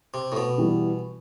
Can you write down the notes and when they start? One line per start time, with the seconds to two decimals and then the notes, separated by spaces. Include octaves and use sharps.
0.14 C3
0.32 A2
0.37 B2
0.58 E3 G3 B3